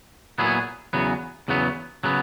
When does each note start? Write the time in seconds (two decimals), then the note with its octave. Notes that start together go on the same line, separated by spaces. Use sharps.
0.38 A#2 F#3 B3 E4 G#4
0.93 E2 C#3 F#3 B3
1.48 E2 C#3 F#3 B3
2.04 C#3 F#3 B3